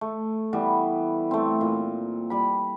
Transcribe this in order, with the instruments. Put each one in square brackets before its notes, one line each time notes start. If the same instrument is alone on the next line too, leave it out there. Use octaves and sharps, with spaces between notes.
[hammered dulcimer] A3
E3 G3 B3
A3 C4
A#2
G3 B5